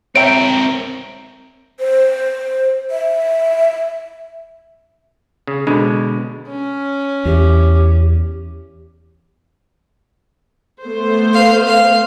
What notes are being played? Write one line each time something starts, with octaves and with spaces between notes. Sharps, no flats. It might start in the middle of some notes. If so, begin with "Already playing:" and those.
C4 A#4 C#5 E5 G5 D7
C5
E5
C#3
B2 D3 G#3 D4
C#4
E2 G4
A3 B3 C5
F5
F5